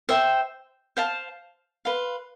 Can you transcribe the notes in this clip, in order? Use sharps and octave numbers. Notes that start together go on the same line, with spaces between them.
C5 E5 G5
C5 F5 A5
B4 F5 C6